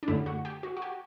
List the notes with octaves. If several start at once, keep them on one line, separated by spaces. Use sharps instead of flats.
D4
F#2 D3 A3 E4
F#4
G4
F#4
F#4
G4